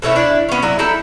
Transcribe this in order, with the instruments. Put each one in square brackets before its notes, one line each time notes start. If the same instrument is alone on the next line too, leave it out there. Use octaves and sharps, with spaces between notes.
[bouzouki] B2 A3 C#4 E4
D4 E4 D5
B3 C#4
F#3 E4 D5
D#4 E4 A4 G5